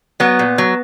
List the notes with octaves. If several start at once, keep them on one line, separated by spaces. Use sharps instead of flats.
F#3 B3
A#2
F#3